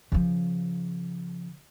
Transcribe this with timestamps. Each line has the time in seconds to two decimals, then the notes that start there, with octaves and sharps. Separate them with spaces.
0.12 C#3 F3